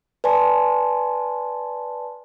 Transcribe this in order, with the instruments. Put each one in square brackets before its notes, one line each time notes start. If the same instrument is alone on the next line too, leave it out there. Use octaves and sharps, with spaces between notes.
[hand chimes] B4 D5 G#5 A5 C6